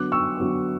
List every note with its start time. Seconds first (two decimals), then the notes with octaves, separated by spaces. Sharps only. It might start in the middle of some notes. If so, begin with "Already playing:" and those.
Already playing: D3 F#3 B3 D6 F#6
0.12 C#6 E6
0.37 D3 F#3 B3